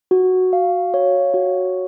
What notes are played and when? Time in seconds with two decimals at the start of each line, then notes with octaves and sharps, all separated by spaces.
0.11 F#4
0.53 F5
0.94 C#5
1.34 F#4